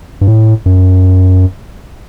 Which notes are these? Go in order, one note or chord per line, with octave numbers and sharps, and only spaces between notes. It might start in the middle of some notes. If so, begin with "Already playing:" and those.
G2
A2
F#2